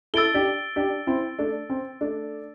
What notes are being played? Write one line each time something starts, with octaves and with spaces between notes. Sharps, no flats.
E4 A4 E6 A6 D7 G7
D4 G4
D4 G4
C4 E4
A3 D4
C4
A3 D4